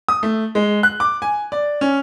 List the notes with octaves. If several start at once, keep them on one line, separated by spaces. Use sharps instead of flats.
D#6
A3
G#3
F#6
D6
G#5
D5
C#4